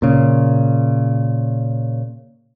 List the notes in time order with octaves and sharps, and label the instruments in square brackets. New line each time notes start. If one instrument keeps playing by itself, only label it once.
[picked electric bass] A#2 C#3